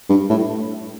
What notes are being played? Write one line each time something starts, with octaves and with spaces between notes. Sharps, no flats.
G2
A2